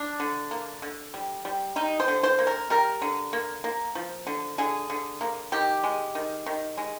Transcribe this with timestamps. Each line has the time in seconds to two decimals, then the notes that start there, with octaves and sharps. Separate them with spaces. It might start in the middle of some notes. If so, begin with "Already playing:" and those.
Already playing: D4
0.20 D3
0.51 A#3
0.82 D3
1.14 G3
1.45 G3
1.76 G3 D#4
2.00 C5
2.08 D3
2.23 C5
2.39 A#3
2.47 A#4
2.70 G3 A#4
3.02 D3
3.33 A#3
3.64 A#3
3.95 F3
4.27 D3
4.58 D3 G#4
4.90 D3
5.21 A#3
5.52 D#3 G4
5.84 G#3
6.15 D#3
6.46 D#3
6.77 G#3